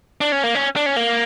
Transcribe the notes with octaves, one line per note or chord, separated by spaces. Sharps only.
D4
C#4
A#3
C#4
D4
C#4
A#3